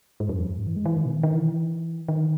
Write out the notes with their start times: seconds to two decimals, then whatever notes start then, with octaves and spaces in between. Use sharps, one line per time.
0.20 G#2
0.29 F#2
0.39 E2
0.48 F#2
0.58 G#2
0.67 E3
0.76 G#3
0.85 E3
0.96 D#3
1.05 B2
1.23 D#3
1.33 E3
2.08 D#3